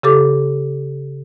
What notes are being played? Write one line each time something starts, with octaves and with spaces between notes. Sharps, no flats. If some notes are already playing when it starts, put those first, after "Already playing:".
C#3 G4 A4 D6